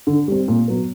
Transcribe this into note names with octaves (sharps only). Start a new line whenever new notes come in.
D3
G3 C4
A#2
F#3 B3